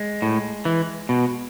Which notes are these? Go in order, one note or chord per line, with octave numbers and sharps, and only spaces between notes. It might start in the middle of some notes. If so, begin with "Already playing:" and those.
Already playing: G#3
A2
E3
B2